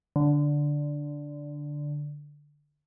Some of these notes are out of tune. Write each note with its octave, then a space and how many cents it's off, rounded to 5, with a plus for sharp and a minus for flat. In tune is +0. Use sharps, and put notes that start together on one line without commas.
D3 -5